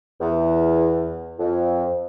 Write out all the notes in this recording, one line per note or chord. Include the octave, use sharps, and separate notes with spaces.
E2
F2